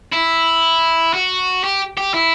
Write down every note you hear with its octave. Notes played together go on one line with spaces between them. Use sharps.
E4
F#4
G4
G4
E4